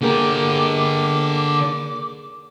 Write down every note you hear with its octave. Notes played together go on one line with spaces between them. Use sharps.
D3 A#3 G4 G#4 A#4 D6